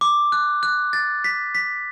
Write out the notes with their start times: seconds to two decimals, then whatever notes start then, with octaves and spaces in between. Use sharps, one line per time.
0.01 D6
0.32 F#6
0.63 F#6
0.93 A6
1.24 B6
1.55 B6